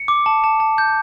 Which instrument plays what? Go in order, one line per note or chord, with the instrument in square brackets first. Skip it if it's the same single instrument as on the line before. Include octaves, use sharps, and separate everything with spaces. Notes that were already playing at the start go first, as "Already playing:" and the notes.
Already playing: [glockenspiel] C#7
D6
A5
A5
A5
G6